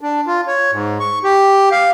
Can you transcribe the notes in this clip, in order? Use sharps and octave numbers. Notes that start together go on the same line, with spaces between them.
D4
F4
C#5
G#2
C#6
G4
F5